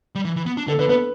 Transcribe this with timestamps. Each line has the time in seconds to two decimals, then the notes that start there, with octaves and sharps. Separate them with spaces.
0.15 G3
0.25 E3
0.36 E3
0.46 B3
0.57 D4
0.67 D3 A4
0.79 D3 B4
0.89 B3 B4